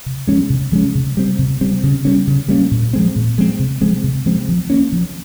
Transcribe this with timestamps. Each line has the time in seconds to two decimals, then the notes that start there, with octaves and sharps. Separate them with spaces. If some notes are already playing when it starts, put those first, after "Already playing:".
0.06 C3
0.27 F3 G#3 C#4
0.50 C3
0.72 F3 G#3 C#4
0.95 C3
1.17 G3 C4
1.38 C3
1.61 G3 C4
1.83 C#3
2.05 G3 A#3 C#4
2.27 C#3
2.48 G3 A#3 C#4
2.71 A#2
2.93 F3 G#3 C4
3.16 A#2
3.38 F3 G#3 C4
3.59 C3
3.81 F3 G#3 C4
4.03 C3
4.26 F3 G#3 C4
4.48 F3
4.70 A#3 C#4
4.92 F3